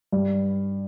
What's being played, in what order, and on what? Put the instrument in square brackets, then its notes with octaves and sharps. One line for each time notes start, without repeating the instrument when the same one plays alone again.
[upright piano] G2